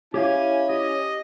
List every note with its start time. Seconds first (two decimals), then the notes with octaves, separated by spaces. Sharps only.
0.14 C#4 E4 G4 C#5 F5 G#5
0.70 G4 D#5